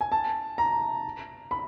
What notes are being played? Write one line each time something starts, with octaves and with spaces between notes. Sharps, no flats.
G#5
A5
A#5
B5